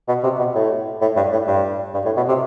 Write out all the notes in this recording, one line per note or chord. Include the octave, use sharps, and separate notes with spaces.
B2
C3
B2
A2
A2
G2
A2
G2
G2
A2
B2
C3